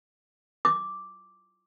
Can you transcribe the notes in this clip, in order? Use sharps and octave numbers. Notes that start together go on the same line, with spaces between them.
D6